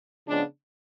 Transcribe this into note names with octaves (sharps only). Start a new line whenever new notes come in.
C#3 F3 G#3 B3 D4